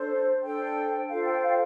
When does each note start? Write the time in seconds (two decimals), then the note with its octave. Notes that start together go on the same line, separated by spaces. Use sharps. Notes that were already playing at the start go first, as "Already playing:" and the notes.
Already playing: D4 A4 C5
0.42 D4 A4 C5 G5
1.08 F4 A4 C5 F5
1.25 G5
1.42 F5